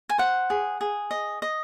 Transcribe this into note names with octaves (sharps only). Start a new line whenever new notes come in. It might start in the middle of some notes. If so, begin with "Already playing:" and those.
G#5
C5 F#5
G#4
G#4
D#5
D#5